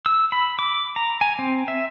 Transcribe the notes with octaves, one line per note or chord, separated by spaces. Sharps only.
E6
B5
D6
A#5
G#5
C4
E5